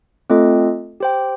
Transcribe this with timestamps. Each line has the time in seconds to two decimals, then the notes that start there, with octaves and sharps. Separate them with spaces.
0.30 A3 C4 F4 A4 D#5
1.00 G4 C5 G5